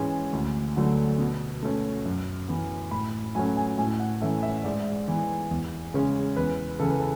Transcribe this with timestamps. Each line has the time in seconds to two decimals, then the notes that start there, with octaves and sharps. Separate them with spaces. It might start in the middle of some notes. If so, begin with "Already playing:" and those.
Already playing: G#2 E3 G#3 C#4
0.33 D2
0.76 D3 F#3 A3
1.19 B2
1.63 A3 C#4
2.06 F#2
2.48 E3 B3
2.91 A2 B5
3.35 F#3 A3 C#4 G#5
3.56 G#5
3.78 A2 G#5
4.00 F#5
4.21 E3 A3 C#4 E5
4.43 E5
4.64 G#2 D5
5.08 E3 B3
5.51 E2
5.94 C#3 G#3 C#4
6.36 E2 B4
6.79 C#3 E3 A4
6.90 B4
7.00 A4